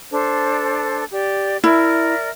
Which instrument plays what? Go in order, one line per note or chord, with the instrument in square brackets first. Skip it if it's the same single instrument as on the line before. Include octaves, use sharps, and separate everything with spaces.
[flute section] D4 A4 C5
G4 D5
[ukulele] E4 [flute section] A#4 D5 E5